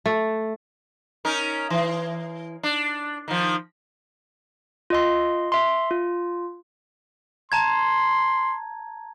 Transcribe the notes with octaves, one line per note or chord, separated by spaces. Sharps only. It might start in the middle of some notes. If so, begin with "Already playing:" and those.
A3
C#4 D#4 A#4
E3
D4
D#3 F3
F4 D#5 C6
E5 C6
F4
A5 A#5 C6 G#6